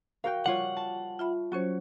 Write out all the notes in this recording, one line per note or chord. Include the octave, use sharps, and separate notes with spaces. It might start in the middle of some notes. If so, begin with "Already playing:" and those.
F#4 A#4 F5 G5
G3 F4 C#5 F#5
A5
F4 E5 B5
F#3 C#4 F#4 C5 C#5